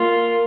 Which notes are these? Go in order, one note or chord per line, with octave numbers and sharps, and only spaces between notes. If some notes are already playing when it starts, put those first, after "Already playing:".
Already playing: A#3 F4